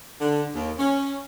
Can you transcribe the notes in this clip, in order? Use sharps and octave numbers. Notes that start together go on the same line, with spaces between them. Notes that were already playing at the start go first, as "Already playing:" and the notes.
D3
D#2
C#4